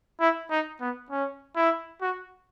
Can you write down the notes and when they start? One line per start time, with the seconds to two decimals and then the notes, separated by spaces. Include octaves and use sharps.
0.20 E4
0.51 D#4
0.81 B3
1.11 C#4
1.56 E4
2.02 F#4